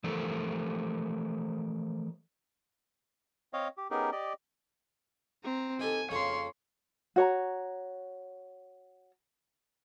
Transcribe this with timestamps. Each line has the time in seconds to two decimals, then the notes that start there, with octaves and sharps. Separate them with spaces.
0.04 E3 F3 A3 A4 A#4 C5
3.53 C4 C#5 D#5 F5
3.77 G4
3.91 B3 C#4 D#4 G4 G#4 A#4
4.12 G4 D5 D#5
5.44 C4 A#5
5.80 D#3 G4 A4 G#5
6.11 F2 C#3 A#3 C#5 C6
7.16 F#4 C#5 A#5